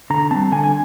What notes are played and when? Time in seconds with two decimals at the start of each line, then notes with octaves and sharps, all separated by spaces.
0.10 D3 A#5
0.31 G3 C4 A5
0.52 D3 G#5
0.64 G#5